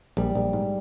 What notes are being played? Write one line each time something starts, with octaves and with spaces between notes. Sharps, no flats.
A#1 G3
A#1
G#2